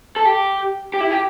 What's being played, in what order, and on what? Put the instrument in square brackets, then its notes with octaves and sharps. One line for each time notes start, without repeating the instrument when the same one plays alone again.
[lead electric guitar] A4
G4
G4
E4
G4